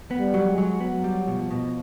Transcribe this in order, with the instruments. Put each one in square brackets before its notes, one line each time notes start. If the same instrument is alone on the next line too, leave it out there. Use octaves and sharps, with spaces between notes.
[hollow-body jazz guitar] B3
[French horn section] G3
[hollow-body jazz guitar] F#3
[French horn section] G#3
[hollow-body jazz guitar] F#3
[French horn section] F#3 [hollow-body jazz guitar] B3
[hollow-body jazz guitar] G3
[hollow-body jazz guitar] B2 [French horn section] F3
[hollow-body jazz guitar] B2